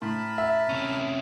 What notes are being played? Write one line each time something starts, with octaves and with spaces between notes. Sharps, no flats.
A2 A#4 A5 B5
E5
C3 C#4